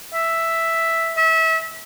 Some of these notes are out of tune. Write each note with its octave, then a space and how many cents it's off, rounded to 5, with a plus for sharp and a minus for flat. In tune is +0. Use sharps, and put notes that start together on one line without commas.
E5 +0
E5 -30